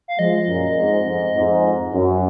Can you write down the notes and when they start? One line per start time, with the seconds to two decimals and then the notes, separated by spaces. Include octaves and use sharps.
0.08 F5
0.18 F3 G#3 D#5
0.48 F#2 A#2
0.76 F2 G#2
1.06 F2 G#2
1.35 F2 G#2
1.94 F#2